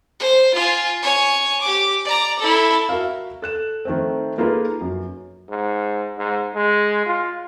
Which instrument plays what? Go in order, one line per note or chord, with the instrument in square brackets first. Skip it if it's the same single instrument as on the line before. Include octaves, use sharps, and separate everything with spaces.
[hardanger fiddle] C5
F4 G#5
C#5 G#5
G4 D6
D5 A#5
E4 A4
[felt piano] F#4 A#4 E5 F5
A4 F#6 E7
D#3 A3 C4
A#3 D#4 F4 G#4 A4 B4
F#2
[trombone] G#2
G#2
G#3
F4